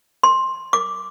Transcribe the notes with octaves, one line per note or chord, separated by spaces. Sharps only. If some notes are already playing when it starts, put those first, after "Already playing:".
C6
D6